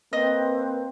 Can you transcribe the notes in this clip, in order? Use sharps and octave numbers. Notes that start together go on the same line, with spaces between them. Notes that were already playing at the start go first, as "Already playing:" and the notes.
A#3 C4 B4 D#5